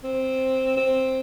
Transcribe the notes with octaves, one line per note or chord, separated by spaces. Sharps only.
C4
C4